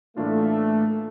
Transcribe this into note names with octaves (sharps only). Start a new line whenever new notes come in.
A2 E3 A3 A#3 D4 F4